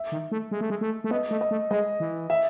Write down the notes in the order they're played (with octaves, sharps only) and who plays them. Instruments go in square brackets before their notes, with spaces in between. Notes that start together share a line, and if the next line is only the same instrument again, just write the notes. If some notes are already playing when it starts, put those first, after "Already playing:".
Already playing: [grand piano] E5
[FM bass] D#3
A3
G#3
A3
G#3
A3
A3
[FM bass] B3 [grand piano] D#5
[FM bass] A3
[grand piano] D#5
[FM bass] A3
[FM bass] G#3 [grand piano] D#5
[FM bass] E3
[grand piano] E5